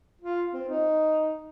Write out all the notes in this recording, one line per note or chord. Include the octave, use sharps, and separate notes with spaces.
F4
C4
D#4